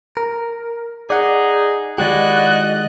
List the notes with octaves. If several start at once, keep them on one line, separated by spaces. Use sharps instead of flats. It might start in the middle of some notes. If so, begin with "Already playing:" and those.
A#4
D#4 G#4 D5 F#5
D#3 G#3 E4 F#4 G4 D5 D#5 F#6